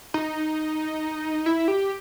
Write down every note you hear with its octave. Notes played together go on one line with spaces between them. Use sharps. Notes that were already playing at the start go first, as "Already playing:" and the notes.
D#4
E4
G4